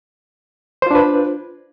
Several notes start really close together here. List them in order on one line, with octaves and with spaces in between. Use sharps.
C5 F4 D4 B4